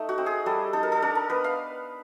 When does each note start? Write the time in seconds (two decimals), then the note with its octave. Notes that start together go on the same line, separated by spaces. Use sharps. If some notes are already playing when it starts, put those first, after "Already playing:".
Already playing: A3 D#4
0.09 F#4
0.18 C4
0.26 G#4
0.46 G3 A4
0.73 D#4 A4
0.83 A#4
0.92 A4
1.02 D4 A#4
1.15 A#4
1.30 B3 B4
1.44 F5